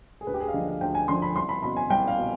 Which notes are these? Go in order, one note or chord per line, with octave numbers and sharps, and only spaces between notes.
G#4
D2 B4
G4
G#4
F5
D3 F3 D#5
F5
D2 G5
G#5
D3 F3 C6
B5
C2 C6
B5
B2 B5
G#5
C2 G5
F5
B2